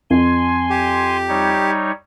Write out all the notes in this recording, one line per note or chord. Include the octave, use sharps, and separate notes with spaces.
F2 G#5 C6
G4
G3 D#4 C#5